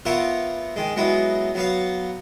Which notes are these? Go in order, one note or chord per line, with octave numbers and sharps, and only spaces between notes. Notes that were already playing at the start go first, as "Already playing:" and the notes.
B3 F4 A#4 C#5 E5
D#3 G#3
F#3 G#3 B3 E4
F#3 B3 F5